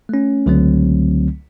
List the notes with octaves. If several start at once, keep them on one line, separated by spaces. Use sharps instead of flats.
A3 C#4
C#2 D3 F#3 A3 C4